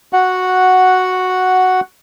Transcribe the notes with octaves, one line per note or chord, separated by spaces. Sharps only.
F#4 F#5